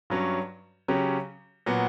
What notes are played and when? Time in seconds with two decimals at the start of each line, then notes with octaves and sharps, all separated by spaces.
0.10 G2 F#3 C#4
0.88 C#3 F#3 C#4 G4
1.66 A#2 F#3 B3 F#4